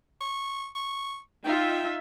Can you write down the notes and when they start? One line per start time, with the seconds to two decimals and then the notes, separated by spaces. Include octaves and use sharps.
0.21 C#6
0.75 C#6
1.45 D#4 F4 E5 G5